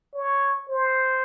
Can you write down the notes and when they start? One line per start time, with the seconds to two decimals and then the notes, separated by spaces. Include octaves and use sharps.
0.15 C#5
0.69 C5